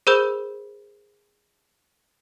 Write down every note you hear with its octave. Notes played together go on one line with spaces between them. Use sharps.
G#4 A#4 C5 B5 E6 G6